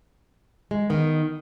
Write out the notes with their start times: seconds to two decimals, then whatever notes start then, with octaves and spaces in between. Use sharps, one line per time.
0.71 G#3
0.90 D#3 B3